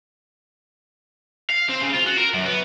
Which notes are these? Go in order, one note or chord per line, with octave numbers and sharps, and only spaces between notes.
F5
C4
C#3
F4
F#4
A#4
F#2
B3